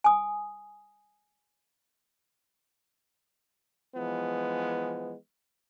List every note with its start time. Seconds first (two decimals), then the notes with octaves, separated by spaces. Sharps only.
0.04 G#5 D#6
3.96 E3 F3 G#3 B3